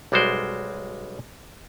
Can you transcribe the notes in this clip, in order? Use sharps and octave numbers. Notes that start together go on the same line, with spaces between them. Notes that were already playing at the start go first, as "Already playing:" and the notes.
B1 G3 G#3 F#4 C5 D5